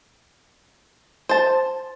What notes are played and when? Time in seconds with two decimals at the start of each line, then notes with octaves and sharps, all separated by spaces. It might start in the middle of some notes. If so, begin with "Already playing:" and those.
1.29 C5 A5